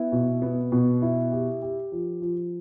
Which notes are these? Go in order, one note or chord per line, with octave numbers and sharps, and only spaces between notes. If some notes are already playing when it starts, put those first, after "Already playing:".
Already playing: B3 E4
B2
B3
B2
E4
G4
G4
F3
F3